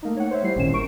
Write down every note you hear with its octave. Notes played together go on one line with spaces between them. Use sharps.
A3 A#3 D#4
C#5 F#5
C5 C#5 E5
G3 E4 C7
G#1 A#2 D#3 C#4 E7
G#1 A#4 C#6 D7